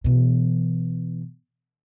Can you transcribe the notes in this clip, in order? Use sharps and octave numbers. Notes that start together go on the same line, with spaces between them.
B2 E3